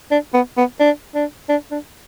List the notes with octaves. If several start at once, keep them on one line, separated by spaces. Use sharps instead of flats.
D4
B3
B3
D4
D4
D4
D4